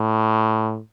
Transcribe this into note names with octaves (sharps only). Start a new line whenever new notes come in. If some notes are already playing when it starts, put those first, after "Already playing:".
Already playing: A2